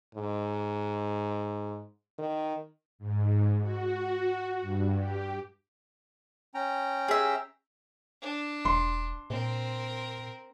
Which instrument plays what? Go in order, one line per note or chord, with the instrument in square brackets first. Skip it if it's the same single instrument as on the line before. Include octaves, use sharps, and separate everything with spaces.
[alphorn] G#2
D#3
[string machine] G#2
F#4
G2
G4
[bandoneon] C#4 G5 A#5
[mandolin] G#4 E5
[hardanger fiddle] D4
[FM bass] E1 [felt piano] C6
[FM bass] A#2 [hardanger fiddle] C4 A#4